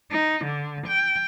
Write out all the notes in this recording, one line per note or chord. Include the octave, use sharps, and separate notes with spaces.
D#4
D3
G5